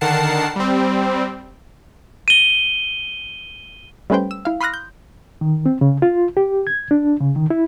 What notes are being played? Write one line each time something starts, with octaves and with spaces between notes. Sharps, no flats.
D3 D#3 A#4 F#5 A5 C7
G3 C4
D#7 G7
G3 A3 C#4 B4 C5 G5
E6
E4 F5
B5 C6 D#6 F6 F#6 A#6
G6
D#3
C4
C#3
F4
G4
G#6
D4
C#3
D#3
E4